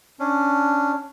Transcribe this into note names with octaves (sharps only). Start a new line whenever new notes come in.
C#4 D4